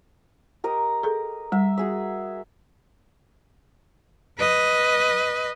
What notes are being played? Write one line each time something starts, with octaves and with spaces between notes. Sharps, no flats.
G4 A#4 D#5
G#4 A4
G3 E5
F#4 G#4 E5
B4 D#5